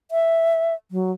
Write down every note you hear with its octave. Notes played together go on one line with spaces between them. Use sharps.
E5
F#3